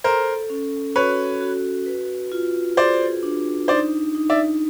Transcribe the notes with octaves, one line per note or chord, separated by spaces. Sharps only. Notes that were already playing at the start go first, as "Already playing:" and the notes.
A4 A#4 C5
C#4
F#4 B4 C#5
F#4
B4
F4
G#4 C5 D5
D4
D#4 C5 D5
D#4
D5 E5